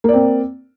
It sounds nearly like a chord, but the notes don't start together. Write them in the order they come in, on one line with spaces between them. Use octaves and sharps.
A#3 D5 C4